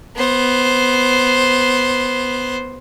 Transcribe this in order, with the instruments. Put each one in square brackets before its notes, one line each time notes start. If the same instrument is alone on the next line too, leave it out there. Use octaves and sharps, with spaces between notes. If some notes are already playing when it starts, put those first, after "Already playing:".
[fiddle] B3 C5